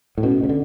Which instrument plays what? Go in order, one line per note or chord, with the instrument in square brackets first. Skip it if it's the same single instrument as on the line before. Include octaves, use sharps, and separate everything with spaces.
[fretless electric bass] A2
[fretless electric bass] B2 [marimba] C#4
[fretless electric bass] C#3
D3